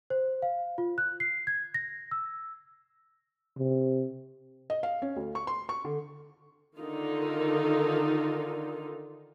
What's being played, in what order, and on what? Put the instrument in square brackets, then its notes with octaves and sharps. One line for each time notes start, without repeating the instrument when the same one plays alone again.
[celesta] C5
F5
F4
F#6
C7
G#6
A#6
E6
[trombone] C3
[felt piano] D#5
F5
C#4
D2
C#6
C6
C#6
D3
[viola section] D3 D#3 D#4 F4